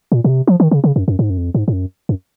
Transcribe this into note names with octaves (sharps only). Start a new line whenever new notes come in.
A#2
A#2
C3
F3
D#3
C#3
C#3
F#2
F#2
G#2
F#2
F2
G#2
G#2
F#2
F#2